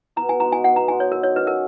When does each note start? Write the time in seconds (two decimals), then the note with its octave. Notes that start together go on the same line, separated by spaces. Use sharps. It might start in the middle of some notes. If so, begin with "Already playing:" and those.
0.16 B2 A#5
0.29 G#5
0.40 G#3 D#4 F#4 A#5
0.52 G#5
0.64 B2 F#5
0.76 A#5
0.88 G#3 D#4 F#4 G#5
1.00 C#5
1.12 D#3 A#4
1.23 C#5
1.36 F#3 C#4 B4
1.47 A#4